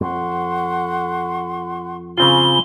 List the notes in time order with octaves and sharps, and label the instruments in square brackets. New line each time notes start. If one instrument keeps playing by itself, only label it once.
[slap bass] F2 [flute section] F#5 C6 C#6
[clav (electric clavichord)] C#3 C4 F4 [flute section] G#5 B5 C6 [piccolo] G7